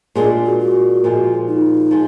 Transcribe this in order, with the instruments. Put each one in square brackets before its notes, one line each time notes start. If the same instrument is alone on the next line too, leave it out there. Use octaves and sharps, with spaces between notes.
[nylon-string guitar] A#2 G#3 D4 [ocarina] G#4
[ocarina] F#4
F#4
[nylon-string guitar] A#2 F3 G#3
[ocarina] D#4
[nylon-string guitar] F3 G#3